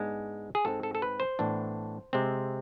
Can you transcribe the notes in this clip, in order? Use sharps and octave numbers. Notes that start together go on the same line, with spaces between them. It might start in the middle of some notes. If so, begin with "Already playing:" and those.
Already playing: G#2 G#3 B3 D4
G#4
G#2 G#3 C4 A4
A4
A4
B4
C5
A2 E3 B3 D4
C3 G#3 C4